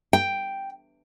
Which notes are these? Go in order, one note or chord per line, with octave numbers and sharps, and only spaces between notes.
G5